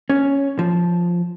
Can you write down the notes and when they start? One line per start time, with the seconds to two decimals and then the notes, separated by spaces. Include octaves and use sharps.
0.10 C#4
0.59 F3